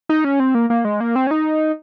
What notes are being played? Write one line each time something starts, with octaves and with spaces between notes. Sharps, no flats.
D#4
C#4
C4
A#3
A#3
G#3
A#3
C4
C#4
D#4